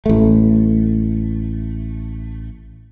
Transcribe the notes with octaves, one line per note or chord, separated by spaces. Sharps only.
A1 A3